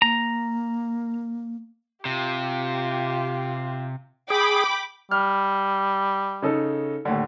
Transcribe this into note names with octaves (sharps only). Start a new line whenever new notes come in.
A#3 A#5
C3 F4 G4
G#4 G5 B5 D6
G3 F6
C#3 D#4 A4
D#2 A2 D3